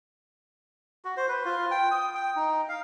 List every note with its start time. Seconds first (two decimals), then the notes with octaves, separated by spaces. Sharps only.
1.05 F#4
1.17 C5
1.29 B4
1.45 F4
1.71 G5
1.91 D#6
2.14 G5
2.36 D#4
2.69 F5